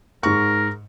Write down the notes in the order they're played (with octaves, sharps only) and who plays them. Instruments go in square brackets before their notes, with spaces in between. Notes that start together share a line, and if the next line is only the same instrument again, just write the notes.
[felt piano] G#2 C#6 [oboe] A#4